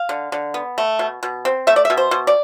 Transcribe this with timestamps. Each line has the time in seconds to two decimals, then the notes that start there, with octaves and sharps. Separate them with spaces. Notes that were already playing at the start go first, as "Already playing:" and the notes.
Already playing: F5
0.09 D3
0.32 D3
0.54 B3
0.78 A3
0.99 B2
1.23 B2
1.45 C4
1.67 A3 E5
1.76 D5
1.85 E5
1.90 B2
1.97 C5
2.11 B2
2.27 D5